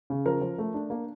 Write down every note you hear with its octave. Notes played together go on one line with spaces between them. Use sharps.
C#3
F3 A#4
F3
A3
D4
A#3